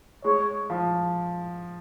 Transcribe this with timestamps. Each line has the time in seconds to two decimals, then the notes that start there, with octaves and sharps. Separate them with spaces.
0.24 G#3 C#5
0.70 F3